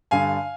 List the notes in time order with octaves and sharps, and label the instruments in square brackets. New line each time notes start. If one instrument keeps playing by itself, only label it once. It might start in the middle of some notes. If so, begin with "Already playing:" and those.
[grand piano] G2 D3 F5 G#5